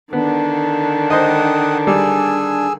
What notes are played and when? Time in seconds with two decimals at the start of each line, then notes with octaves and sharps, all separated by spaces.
0.13 D3 D#3 B3 D4
1.10 C5 D#5 F#5 G5 D#6
1.87 G3 G#4 G#5 E6